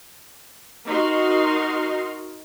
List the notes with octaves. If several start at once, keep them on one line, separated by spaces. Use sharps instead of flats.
D#4 F#4 A#4 C6